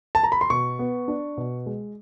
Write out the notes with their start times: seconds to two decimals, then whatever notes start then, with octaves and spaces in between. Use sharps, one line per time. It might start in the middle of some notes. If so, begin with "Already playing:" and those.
0.15 A5
0.23 A#5
0.32 B5
0.41 C6
0.50 B2 C#6
0.79 B3
1.08 D4
1.37 B2
1.66 G#3